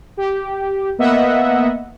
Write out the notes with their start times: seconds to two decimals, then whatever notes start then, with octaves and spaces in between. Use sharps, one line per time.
0.17 G4
0.98 A#3 B3 D#5 E5 F#5